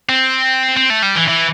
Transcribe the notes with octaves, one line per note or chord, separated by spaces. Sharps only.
C4
C4
A3
G3
E3
E3